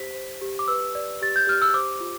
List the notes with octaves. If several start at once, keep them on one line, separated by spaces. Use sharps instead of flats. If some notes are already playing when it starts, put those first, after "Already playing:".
Already playing: G4 C5 B6
C5
G4
D6
B4 E6
D5
G4 A6
G6
G4 F6
E6
C5 D6
F4